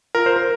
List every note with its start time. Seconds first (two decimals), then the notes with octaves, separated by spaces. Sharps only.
0.15 F4 A#4
0.26 C5
0.36 A#4